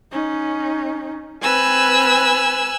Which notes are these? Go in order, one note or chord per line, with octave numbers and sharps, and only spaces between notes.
C#4 D#4
C4 B4 G#5 E6 F#6